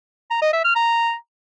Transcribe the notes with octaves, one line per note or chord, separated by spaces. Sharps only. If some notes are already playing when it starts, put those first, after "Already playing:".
A#5
D#5
E5
F6
A#5